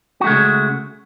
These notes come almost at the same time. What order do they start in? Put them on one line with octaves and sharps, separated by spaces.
F#4 A3 G#3 C#3